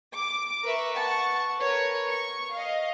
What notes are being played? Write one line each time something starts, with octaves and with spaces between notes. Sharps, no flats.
D6
A#4 B4 E5 C#6
F#5 A5 C#6
A#4 B4 C#5
C#6
D#5 F5